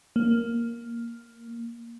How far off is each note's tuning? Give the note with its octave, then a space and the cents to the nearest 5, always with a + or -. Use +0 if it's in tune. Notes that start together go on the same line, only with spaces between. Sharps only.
A#3 +0